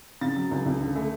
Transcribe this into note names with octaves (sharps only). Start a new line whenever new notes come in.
C#3 A6
F#3
C#2
C#2
D3
A3